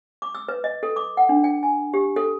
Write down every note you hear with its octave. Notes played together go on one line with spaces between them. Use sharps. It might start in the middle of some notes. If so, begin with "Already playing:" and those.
D6
E6
B4
D#5
A4
D6
F#5
D4
G5
G#5
G4
A4